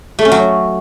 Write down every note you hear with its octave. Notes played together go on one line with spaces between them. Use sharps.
A3
C#4
F#3